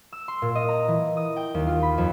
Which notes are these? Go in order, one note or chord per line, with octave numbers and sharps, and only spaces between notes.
E6
C6
A#2
D#5
A#5
E3
D#6
G5
D#2
F4
B5
F2